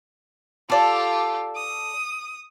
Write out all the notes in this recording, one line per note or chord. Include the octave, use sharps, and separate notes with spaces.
F4 G4 A4 D5
D#6